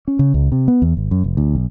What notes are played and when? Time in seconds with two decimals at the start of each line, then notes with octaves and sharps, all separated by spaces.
0.08 C#4
0.19 C#3
0.34 C#2
0.52 C3
0.68 B3
0.82 E2
0.97 G#1
1.11 F#2
1.24 F1
1.37 D2
1.55 B1